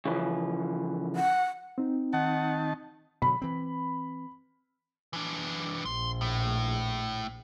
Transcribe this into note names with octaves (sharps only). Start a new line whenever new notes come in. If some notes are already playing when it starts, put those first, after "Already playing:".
C#3 E3 F3
F#5
C4 D#4
D#3 F#5 A5
B2 D3 F#3 B5
E3 C4
E3 D4
A#1 C6
A2